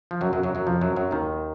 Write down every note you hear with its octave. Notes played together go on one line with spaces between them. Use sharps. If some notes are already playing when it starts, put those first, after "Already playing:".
F3
F#2 F#3
F#2 F#3
F#2 F#3
F#2 F#3
F2 F3
F#2 F#3
F#2 F#3
D#2 D#3